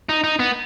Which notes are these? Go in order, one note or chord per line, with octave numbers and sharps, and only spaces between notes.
D#4
D#4
B3